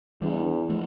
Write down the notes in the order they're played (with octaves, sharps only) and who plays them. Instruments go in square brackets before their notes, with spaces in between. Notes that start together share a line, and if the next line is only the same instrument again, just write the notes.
[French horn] E2 [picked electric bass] E3 G3 D4
[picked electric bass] F3 A3